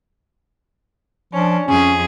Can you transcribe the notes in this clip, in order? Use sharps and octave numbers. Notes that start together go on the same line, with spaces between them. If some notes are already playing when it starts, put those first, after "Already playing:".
F3 C#4 D4
F2 C#4 G#4